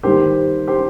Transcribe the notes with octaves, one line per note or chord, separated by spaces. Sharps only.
D#3 G3 A#3 G4 C5
G4 C5